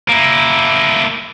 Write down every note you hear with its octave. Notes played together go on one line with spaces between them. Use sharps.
A#3 E4